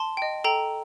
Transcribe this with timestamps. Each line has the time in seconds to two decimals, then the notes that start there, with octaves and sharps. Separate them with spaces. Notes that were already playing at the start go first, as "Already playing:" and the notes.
Already playing: A5 C6
0.17 D#5 G5
0.44 A4 G5 A#5